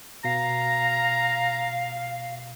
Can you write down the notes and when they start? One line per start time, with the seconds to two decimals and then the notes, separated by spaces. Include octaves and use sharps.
0.24 B2 F5 A#5 C7